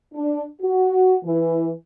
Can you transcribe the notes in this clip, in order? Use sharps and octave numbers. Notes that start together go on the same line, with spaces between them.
D4
F#4
E3